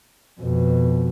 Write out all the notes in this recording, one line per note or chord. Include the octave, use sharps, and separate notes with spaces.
F2 B2